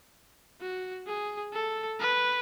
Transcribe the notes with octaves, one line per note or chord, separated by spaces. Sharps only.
F#4
G#4
A4
B4